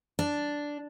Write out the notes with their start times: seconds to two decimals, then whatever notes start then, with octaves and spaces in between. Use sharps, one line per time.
0.19 D4